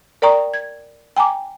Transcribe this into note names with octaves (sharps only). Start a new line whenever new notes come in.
A#4 D5 G5 A#5 C#6 D#6
G#6
G5 G#5 A#5 D6